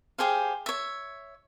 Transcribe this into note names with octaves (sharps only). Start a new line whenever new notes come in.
G4 G#4 C5 F5
C#5 E5